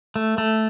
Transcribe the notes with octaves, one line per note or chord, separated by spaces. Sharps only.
A3
A3